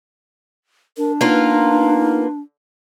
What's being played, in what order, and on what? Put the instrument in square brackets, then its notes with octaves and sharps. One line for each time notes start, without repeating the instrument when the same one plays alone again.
[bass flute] D4 [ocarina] A#4
[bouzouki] A#3 B3 F4 [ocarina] D#4